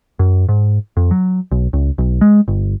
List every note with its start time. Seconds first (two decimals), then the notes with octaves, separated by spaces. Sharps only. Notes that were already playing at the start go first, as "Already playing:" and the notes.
0.19 F#2
0.49 G#2
0.97 F2
1.11 F#3
1.51 B1
1.73 C#2
1.98 B1
2.21 G#3
2.48 G1